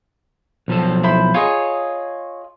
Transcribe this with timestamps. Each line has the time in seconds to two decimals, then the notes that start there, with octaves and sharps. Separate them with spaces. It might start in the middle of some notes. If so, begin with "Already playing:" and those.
0.68 B1 F3 A4
1.03 E4 C5 B5
1.34 F4 G#4 C#5 D#5